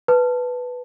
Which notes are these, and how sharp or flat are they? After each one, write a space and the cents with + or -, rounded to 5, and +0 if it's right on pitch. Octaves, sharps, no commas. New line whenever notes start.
B4 +0 A5 +0